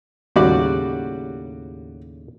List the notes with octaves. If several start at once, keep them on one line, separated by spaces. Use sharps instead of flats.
D#2 A2 C#3 G3 F#4 D5